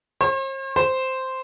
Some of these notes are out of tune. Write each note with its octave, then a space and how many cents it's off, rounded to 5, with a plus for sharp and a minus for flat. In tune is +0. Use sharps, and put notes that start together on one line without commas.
C5 +45
C5 -5